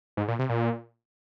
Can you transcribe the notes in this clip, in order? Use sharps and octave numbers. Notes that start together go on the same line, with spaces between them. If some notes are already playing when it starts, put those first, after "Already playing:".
G#2
A#2
C3
A#2